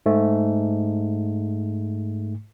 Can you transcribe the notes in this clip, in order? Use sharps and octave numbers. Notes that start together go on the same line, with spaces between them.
G#2 A3